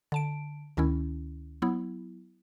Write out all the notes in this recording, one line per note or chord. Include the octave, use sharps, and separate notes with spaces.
D3 A5 D7
D2 D#3 C#4 E4
F#3 B3 E4